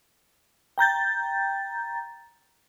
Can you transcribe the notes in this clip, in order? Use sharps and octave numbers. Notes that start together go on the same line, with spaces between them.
G5 A#5 G6 A6